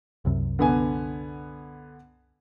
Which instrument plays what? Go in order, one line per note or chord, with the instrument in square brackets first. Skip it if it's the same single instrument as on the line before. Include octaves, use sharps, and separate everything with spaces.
[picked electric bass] C2 F#2 C3
[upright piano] D3 B3 G#5